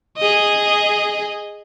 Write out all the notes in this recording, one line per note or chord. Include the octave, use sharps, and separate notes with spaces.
G#4 D#5